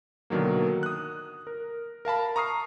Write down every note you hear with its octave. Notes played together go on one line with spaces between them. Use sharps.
B2 D3 D#3 F#3 A#3
D#6 F#6
A#4
A#4 F5 A5 B5
A#5 C#6 D#6 F6 C7